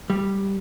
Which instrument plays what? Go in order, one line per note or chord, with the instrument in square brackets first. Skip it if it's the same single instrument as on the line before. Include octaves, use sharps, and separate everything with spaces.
[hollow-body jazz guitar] G3